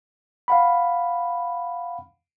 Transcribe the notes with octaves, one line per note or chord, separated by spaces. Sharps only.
F5 F#5 B5